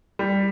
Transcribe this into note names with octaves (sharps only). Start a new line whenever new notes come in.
G3